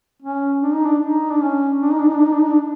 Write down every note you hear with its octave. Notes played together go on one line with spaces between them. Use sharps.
C#4
D4
D#4
D4
D#4
D4
C#4
D4
D#4
D4
D#4
D4
D#4
D4
D#4
D4